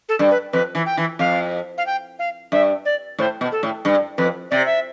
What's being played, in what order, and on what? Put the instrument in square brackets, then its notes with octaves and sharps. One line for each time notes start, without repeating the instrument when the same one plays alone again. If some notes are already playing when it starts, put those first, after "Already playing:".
[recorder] A4
[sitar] G2
[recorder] B4
[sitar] F2 [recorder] B4
[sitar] E3
[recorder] G5
[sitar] E3
[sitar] F2 [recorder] F5
[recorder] F5
G5
F5
[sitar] G2 [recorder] E5
[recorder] D5
[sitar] A2 [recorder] C5
[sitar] B2
[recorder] A4
[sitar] A2
G2
[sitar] F2 [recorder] B4
[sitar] C3 [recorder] D5
[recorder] E5